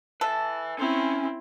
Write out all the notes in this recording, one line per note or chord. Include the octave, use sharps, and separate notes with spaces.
A4 B4 E5
C4 C#4 E4